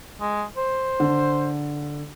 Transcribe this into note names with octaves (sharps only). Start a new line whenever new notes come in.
G#3
C5
D3